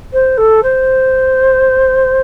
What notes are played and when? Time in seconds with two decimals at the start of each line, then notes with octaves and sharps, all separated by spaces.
0.13 C5
0.37 A4
0.63 C5